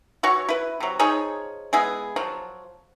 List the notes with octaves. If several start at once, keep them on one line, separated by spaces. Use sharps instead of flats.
E3 F#4 C#5 C#6
E4 B4
C3 F#3
F3 D#4 G#4 C#5
G#3 B3 E4 G#4
F3 F#3